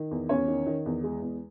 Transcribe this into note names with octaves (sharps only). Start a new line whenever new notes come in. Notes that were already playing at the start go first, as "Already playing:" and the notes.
Already playing: D#3
E2
E2 C#4 C#5
D#3
D#3
E2
G#3
E2